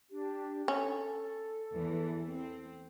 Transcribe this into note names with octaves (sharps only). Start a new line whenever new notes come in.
D4 G4
C#4 A4
E2 E3
C4